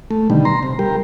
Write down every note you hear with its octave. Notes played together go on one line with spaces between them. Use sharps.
A3
B2 D3 D#3 G3
A#5 C6
C3
G3 G4 A#4